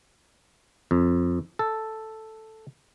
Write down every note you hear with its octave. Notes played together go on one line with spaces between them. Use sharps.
F2
A4